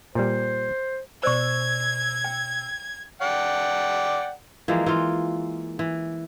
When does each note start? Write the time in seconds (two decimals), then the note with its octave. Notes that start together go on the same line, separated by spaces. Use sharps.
0.15 A#2 G3 C5
1.23 B2 C5 D5 C#6 E6 G#6
2.24 G5
3.22 D5 F#5 G5
4.68 E3 F3 G#3 A#3
4.86 E3 F4
5.79 E3